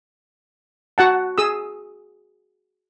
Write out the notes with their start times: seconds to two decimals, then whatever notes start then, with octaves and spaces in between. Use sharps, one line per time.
0.98 F#4 F#5 A5
1.38 G#4 D#6 E6